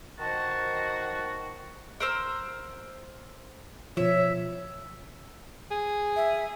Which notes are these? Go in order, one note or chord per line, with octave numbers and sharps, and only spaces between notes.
D#3 F#4 C5 A5
A#4 C5 E6
B2 F3 C#5 E5
G#4
E5